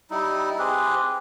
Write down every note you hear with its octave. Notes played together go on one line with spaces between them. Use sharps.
G3 D#4 E4
C4 G4 G#4 B4